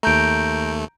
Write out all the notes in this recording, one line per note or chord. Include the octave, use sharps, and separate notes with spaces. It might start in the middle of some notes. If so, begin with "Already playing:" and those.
D#2 A3 A#5 G6 D7